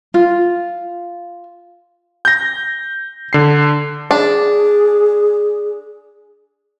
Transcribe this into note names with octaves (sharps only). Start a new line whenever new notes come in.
F4
G6 A#6
D3 C7
D4 G#4